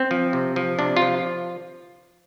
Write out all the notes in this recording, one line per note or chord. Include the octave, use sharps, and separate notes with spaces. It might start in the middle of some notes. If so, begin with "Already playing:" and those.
Already playing: C4
F3
C3
F3
C3 D4
F4
F3